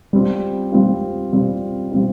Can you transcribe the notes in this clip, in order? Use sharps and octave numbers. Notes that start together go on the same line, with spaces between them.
G3 C4 F4
G3 C4 F4
G3 C4 F4
G3 C4 F4